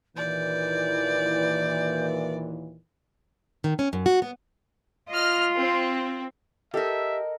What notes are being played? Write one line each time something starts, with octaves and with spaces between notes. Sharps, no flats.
D#2 A#2 E3 D5 G6
D#3
C#4
F#2
F#4
B3
F4 D#5 F6
C4
G4 A4 A#4 D#5 E5